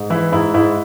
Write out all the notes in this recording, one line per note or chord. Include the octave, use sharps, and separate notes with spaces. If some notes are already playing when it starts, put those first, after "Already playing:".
Already playing: G#2
E3 E4
G#2 E4
G#2 E4